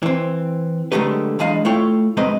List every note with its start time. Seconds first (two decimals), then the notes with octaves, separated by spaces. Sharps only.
0.03 E3 C4
0.92 D3 F#3 G#3 A3 G4 B4
1.39 E2 G#3 D4 D#5 F5
1.65 A3 E4 F4 C#5 G5
2.17 G2 F#3 G#3 C4 B4 D#5